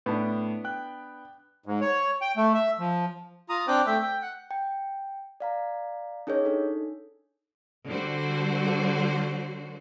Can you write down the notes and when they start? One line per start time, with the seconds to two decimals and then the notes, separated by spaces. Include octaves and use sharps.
0.06 A2 B3 D4 A5
0.64 G5 F#6
1.66 G#2
1.81 C#5
2.21 G5
2.37 A3
2.54 E5
2.79 F3
3.49 F4 A#5 D#6
3.68 C4 D4 C5 G5 D6 F#6
3.86 A3 E5 G5
4.02 G5
4.22 F#5
4.51 G5
5.40 D5 F5 A#5
6.27 C#4 D#4 G#4 A#4 C#5 D#5
6.45 D4 D#4 A4
7.87 D3 G3 F#4 C5